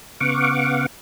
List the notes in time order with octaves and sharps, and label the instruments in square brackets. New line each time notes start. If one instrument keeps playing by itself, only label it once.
[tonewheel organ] C#3 B3 F5 F#5 C#6 D6